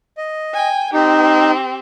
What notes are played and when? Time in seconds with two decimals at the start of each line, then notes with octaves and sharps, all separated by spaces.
0.18 D#5
0.54 G5 G#5
0.93 C4 D#4 G4